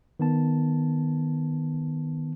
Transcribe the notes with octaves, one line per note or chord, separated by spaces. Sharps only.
D#3 B3 A5